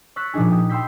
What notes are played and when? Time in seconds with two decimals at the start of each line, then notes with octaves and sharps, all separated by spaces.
0.16 C#6 E6 F#6 A6 B6
0.34 A#2 F3 D4 D#4 G#4
0.50 G4 D#6
0.69 G5 B5 C6 E6 G6 B6